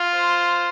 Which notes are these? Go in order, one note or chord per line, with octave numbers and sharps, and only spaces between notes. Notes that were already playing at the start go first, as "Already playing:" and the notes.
Already playing: F4
C5